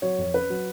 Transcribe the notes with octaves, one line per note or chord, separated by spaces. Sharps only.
F#3 C#5
F2
C#4 B4
F#3